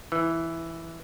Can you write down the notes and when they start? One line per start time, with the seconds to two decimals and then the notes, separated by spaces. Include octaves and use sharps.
0.12 E3